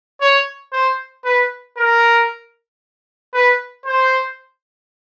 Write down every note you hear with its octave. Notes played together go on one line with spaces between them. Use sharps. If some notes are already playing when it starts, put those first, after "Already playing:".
C#5
C5
B4
A#4
B4
C5